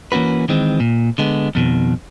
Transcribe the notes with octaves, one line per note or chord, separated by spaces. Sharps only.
E3 A#3 C#4 F#4 B4
D#3 E3 G#3 C4
A#2
D3 G#3 B3
F2 B2 D#3